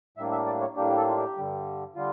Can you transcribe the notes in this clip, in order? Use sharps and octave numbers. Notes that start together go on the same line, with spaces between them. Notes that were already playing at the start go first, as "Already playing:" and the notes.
A2 G3 A#3 D4 E5
E5
D5
C#5
A2 G3 A#3 D4 G4
G4
A4
F4
G4
G2 D3 G3
D3 G3 F4